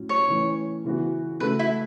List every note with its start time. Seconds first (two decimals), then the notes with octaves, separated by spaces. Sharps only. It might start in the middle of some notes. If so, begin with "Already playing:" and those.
Already playing: A2 F#3 C#4
0.09 C#5
0.28 E3 A3 C#4
0.84 C#3 E3 B3 F#4
1.40 C#3 A3 F#4 A4 B4
1.59 E4